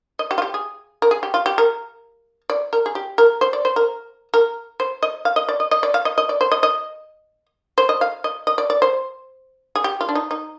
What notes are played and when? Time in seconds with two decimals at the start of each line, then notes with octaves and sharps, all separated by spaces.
0.19 D#5
0.31 G4
0.38 F4
0.42 G4
0.54 G#4
1.02 A#4
1.11 G#4
1.23 G4
1.34 F4
1.46 G4
1.58 A#4
2.50 D5
2.73 A#4
2.86 G#4
2.95 G4
3.18 A#4
3.41 C5
3.53 D5
3.65 C5
3.76 A#4
4.34 A#4
4.80 C5
5.03 D#5
5.25 F5
5.36 D#5
5.49 D5
5.60 D#5
5.71 D#5
5.83 D5
5.94 F5
6.05 D#5
6.18 D#5
6.29 D5
6.41 C5
6.52 D#5
6.63 D#5
7.78 C5
7.89 D#5
8.01 F5
8.24 D#5
8.47 D#5
8.58 D5
8.70 D5
8.82 C5
9.76 G#4
9.84 G4
10.01 F4
10.09 D4
10.15 D#4
10.31 D#4